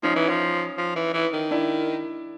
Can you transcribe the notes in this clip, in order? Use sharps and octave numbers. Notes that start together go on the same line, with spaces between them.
F3 C#4 D#4
E3
F3
F3
E3
E3
D#3
D4 E4